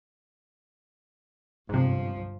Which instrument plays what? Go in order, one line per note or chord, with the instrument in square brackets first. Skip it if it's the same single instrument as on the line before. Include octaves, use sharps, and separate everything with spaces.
[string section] G1 F3 [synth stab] G#2 C3